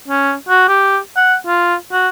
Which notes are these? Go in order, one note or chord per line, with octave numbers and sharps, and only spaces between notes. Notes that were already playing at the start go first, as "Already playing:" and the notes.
C#4
F#4
G4
F#5
F4
F#4